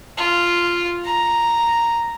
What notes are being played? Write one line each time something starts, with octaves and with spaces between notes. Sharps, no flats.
F4
A#5